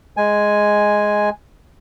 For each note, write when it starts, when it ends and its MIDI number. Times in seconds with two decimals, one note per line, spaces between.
0.17 1.29 56
0.17 1.29 80